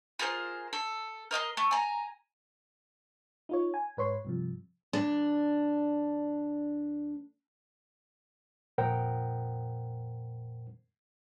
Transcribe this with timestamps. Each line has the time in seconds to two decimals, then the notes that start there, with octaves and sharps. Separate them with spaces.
0.19 F4 G#4 A#4 C5
0.73 A4
1.31 A#4 D#5 A5 C6
1.57 A3
1.71 G#5 A#5
3.49 D#4 F4 C#5
3.74 G#5
3.97 G#2 B4 C#5 C6
4.25 G2 C3 F3
4.93 D2 D4
8.78 F2 A#2 A#4 C5 F#5 G5